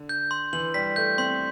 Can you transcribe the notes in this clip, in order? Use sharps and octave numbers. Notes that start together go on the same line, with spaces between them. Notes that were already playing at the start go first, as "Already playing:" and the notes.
Already playing: D3
G6
C6
E3 F#7
G3 B6
A3 G6
C4 C6